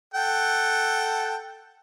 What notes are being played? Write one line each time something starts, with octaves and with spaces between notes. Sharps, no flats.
A4 F#5 G5